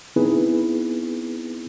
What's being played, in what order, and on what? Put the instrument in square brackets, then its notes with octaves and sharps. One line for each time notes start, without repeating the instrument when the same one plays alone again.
[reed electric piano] B3 C4 D#4 E4 G#4 B4